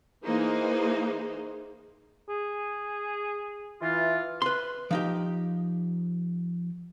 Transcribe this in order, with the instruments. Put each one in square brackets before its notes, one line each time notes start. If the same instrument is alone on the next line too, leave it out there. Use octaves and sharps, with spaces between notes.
[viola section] E3 A#3 D#4 G#4 C5
[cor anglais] G#4
[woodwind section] E3 F4
[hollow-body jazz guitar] B4 C6
F3 D#4 G4